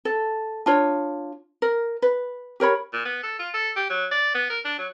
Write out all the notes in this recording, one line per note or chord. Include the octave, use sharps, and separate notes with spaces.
A4
D4 F4 C#5
A#4
B4
G4 A#4 C#5 B5
A#2
B3
A4
F4
A4
G4
F#3
D5
B3
A#4
D4
F#3